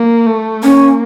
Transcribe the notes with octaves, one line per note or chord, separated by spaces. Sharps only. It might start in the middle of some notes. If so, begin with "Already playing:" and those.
Already playing: A#3
A3
A#3 C#4